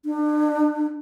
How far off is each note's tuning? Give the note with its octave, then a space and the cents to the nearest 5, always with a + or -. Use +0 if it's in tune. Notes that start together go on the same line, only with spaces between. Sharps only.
D4 +35